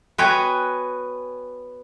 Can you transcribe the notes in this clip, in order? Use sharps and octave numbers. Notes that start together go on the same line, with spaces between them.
B3 F#4 B4 C#5 G5 G#5